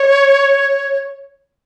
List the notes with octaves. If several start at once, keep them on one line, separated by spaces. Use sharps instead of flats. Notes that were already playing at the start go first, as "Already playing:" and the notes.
Already playing: C#5